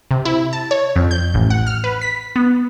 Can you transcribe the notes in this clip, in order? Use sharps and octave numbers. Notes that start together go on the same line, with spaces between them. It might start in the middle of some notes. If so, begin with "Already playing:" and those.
C3
E4
A5
C#5
F2
G6
A1
F#5
F6
B4
B6
B3